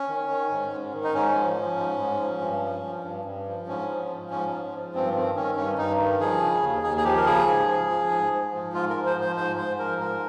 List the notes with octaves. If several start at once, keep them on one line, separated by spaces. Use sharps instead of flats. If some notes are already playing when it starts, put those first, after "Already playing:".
Already playing: C#4
D#3
D#3
G#2
G#2
D#3
D#4
G#2 C#4
F3
F3
G#2
G#2
F3
G2
F3
F3
G2
G2
F3
G#2 C#4
F3
F3
G#2 C#4
G#2
F3
G2 C4
D#3 C4
D#3 C#4
G2 C#4
G2 D#4
D#3
F3 G#4
C#3
D#2
D#2 G#4
G#4
F3 G4
A#4
C#3 G#4
G#2
F3
F3
G#2
G#2
F3
G#2 F4
F3 A#4
C5
F3 C5
G#2 C5
G#2 C5
F3 A#4
G#2 A#4